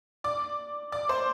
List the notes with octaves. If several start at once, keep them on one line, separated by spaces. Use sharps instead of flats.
D5 D6
D5 D6
C5 C6